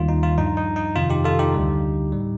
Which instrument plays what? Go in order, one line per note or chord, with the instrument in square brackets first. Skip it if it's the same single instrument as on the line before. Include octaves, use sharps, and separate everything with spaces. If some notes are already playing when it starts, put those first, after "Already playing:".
Already playing: [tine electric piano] D#2 D#3 G3 F4
D#4
F4
G2 F3 D#4
D#4
D#4
F2 C3 D#3 F4
D#4 G4
F4 A4
D#4 G4
D2 D3 G3
A2 G3